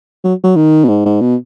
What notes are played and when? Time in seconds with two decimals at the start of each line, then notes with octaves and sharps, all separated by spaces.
0.24 F#3
0.43 F#3
0.56 D#3
0.84 B2
0.88 G#2
1.05 G#2
1.21 B2